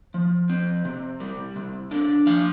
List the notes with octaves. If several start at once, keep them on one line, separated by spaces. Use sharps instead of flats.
F3
C4
C3
G3
C3
D4
F3 F5